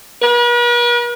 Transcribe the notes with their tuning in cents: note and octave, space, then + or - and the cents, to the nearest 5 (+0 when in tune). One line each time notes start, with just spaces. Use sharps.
B4 -45